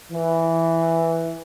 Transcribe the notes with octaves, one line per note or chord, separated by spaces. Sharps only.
E3